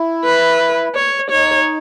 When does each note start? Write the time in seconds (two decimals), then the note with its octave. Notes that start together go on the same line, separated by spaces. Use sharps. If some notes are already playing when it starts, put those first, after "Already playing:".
Already playing: E4
0.25 B4
0.95 C#5
1.31 D#4 C#5